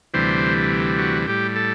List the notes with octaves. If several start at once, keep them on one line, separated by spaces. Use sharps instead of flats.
D2 C3 E3 G3 C5
F#4
A2 G3 G4
A4